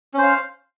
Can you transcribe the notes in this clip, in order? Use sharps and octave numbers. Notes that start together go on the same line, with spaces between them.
C#4 C5 F5